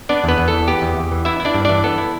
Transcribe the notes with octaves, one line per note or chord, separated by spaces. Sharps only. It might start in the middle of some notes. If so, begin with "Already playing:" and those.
B3 D4 D5
E2 B3 B4
E2
A4
E3
B3 G4
E2
E2
E3
B3 E4 E5
E4
D4 D5
G2
E3 D4 D5
B3 A4
E4